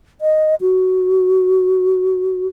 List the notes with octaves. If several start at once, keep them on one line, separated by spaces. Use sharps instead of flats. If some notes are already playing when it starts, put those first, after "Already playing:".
D#5
F#4